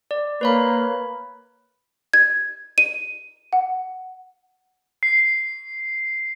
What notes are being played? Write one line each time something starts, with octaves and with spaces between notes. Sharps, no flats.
D5
A#3 B4 C#5 B5
G#6
D#7
F#5
C7